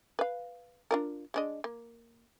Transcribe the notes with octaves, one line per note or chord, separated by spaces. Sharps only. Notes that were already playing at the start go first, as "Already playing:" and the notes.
B4 F5
D4 F4 A#4
G#3 D4 D#5
A#3